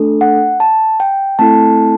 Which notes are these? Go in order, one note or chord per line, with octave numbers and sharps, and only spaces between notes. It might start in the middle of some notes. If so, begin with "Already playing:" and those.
Already playing: A3 D4 A4
F#5
A5
G5
A3 C4 E4 A4 A5